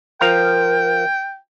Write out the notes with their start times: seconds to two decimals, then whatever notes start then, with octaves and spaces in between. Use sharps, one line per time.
0.21 F3 A#4 F5 G5 A#5